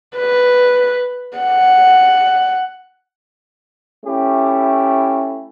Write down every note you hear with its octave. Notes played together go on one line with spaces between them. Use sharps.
B4
F#5
A3 C#4 E4 G4